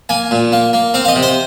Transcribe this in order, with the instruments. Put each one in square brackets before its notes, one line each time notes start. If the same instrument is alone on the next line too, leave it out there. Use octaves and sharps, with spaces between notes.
[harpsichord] A#3 G#5
A#2
A#3
A#3
C4 F5
F5
D#5
C3
C5